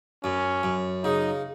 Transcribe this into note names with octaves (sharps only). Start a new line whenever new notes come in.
F#2 C#4
F#2
C#3 D#4